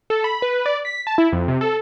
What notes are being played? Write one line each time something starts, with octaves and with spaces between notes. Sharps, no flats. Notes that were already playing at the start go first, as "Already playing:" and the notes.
A4
B5
B4
D5
B6
A5
E4
F2
C3
A4